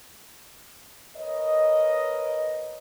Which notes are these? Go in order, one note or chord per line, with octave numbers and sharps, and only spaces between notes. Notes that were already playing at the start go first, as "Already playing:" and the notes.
A#4 B4 C#5 D#5